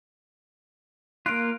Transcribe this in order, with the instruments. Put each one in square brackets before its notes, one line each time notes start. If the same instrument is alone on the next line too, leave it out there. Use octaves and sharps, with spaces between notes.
[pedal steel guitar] A#3 F4 [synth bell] F#6 D7